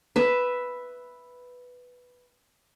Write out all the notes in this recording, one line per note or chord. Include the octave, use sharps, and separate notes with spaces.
B4 E5